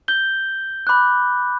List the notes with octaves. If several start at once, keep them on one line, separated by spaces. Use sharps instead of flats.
G6 G7
B5 D6 F#6